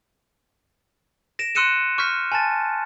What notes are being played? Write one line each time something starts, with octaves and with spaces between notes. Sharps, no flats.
A#6 D7 E7
C6 E6 F#6 C#7 D#7 E7
C#6 F6 G6 B6
G#5 A5 A6